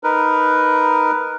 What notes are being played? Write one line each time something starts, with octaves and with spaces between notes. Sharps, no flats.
D#4 A#4 B4